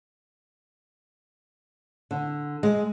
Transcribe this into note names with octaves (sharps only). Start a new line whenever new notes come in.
D3
G#3